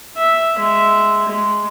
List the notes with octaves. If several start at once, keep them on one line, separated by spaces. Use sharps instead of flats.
E5
G#3 E5
G#3